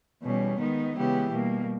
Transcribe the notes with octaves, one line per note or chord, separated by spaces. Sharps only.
E2 B2 G3 C#4
D#3 G#3 B3 D#4
C#3 E3 G#3 B3 G4
B2 G3 A#3